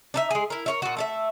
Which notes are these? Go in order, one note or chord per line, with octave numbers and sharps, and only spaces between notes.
D4 D#4 E5
G#3 G#4
E4 A#4
A#4 C#5 E5
A#2 F#4
A3 D5 E5